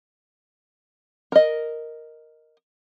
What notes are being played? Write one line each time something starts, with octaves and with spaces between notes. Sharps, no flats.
A#4 D#5